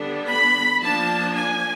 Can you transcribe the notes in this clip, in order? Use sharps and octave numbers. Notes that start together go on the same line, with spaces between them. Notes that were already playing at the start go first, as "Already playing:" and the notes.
Already playing: D3 G3 B3 D4
B5
F3 A#3 D4 A5
G#5